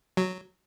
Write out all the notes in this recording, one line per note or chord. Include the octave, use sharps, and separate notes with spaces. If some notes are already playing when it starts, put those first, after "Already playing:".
F#3